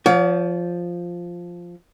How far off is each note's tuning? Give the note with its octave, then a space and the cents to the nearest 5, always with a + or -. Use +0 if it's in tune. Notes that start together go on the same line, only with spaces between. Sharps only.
F3 +0 C#5 +45 F#5 -40